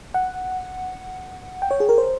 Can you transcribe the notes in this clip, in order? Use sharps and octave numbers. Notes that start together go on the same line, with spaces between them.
F#5
G5
C#5
G#4
A#4
C5